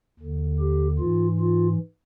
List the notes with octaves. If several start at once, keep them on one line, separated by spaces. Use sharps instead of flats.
D#2 D3
G4
G#2 E3 F4
F4